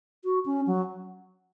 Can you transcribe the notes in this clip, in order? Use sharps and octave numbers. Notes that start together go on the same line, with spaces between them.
F#4
C#4
F#3